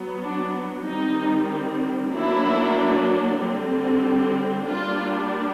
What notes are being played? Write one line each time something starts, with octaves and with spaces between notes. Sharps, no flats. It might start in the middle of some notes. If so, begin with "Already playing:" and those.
Already playing: F#3 B3
D4
D#3 G3 C4 D#4
F#3 A#3 D4 E4
D3 G3 C4
G3 A#3 D4 F4